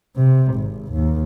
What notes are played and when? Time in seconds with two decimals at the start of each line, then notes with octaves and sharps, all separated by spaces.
0.16 C3
0.54 G#1
0.92 D#2